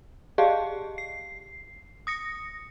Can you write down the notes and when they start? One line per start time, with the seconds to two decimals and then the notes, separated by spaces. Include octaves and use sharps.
0.38 G4 G#4 D5 D#5 F5 A5
0.98 C7
2.07 D#6 A#6 C#7